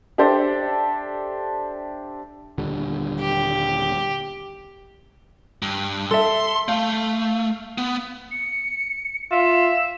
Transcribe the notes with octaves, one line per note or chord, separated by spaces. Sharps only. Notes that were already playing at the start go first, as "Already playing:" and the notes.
D4 G4 A4 C5 D5 E5
D#1 D3 G3
G4
G2
A4 E5 C6
A3 F5
B3
C#7
F4 E5 E7